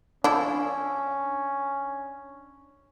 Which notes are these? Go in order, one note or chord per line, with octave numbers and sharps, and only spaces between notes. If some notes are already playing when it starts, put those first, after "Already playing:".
F3 C#4 D4 E4